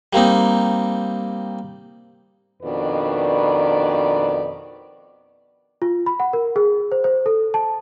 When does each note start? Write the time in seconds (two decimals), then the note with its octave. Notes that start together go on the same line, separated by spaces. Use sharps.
0.13 G3 A#3 C4 D#4
2.63 F2 B2 D#3 D4 B4 D5
5.82 F4
6.06 B5
6.20 F#5
6.33 A#4
6.56 G#4
6.92 C5
7.04 C5
7.26 A4
7.54 A5